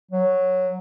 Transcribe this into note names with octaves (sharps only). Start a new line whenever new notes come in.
F#3